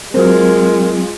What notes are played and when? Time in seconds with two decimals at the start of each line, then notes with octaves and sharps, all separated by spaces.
0.14 F#3 G#3 C4 F4 F#4 A#4 C5